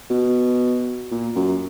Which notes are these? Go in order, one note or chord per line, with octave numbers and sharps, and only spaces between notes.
B2
A#2
F#2